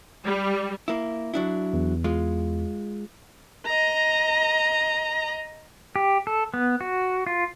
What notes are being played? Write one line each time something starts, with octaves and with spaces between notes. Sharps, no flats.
G3
A#3 E4
F#3 D4 E4
E2
G#3 F4
D#5 A#5
G4
A4
B3
F#4
F4